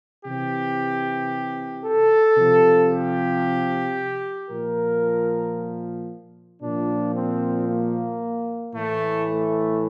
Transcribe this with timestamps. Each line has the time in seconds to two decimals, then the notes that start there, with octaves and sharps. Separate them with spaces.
0.25 C3 E3 G4
1.84 A4
2.37 C3 F3
2.91 G4
4.50 A#2 F3 A#4
6.62 A#2 F3 D4
7.14 C4
7.68 A#3
8.74 A2 E3 A3
9.27 A3